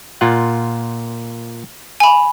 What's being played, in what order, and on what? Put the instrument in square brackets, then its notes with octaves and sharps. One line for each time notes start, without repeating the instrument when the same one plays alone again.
[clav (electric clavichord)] A#2 F4 F#5
[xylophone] G#5 B5